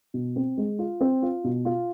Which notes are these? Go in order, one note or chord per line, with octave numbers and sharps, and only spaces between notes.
B2
C4
G#3
F4
C4
F4
B2
F4